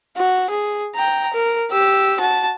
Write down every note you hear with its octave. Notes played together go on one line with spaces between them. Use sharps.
F#4
G#4
G5 A#5
A#4
G4 E6
F#4 A5